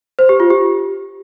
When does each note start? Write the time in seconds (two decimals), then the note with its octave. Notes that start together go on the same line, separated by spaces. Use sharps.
0.19 C5
0.29 G4
0.40 F4
0.50 G4